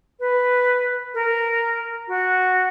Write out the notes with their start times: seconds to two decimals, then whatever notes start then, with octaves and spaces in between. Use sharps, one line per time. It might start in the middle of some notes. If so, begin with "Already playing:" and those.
0.19 B4
1.14 A#4
2.07 F#4